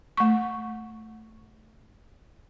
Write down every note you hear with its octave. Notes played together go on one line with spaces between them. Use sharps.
A3 C#6